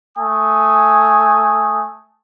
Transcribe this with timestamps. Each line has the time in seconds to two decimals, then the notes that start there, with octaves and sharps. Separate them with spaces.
0.17 A3 G#5 D#6